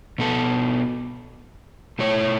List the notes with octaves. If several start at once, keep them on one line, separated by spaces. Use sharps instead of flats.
B2 B3 A4
B2 A3 E4 C#5